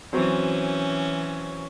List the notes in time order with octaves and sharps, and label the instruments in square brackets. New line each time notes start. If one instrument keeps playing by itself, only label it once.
[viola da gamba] E3 C#4 [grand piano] F#3 C4